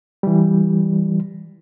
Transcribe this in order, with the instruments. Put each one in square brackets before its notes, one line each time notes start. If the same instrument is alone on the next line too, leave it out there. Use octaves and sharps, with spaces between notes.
[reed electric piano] E3 G3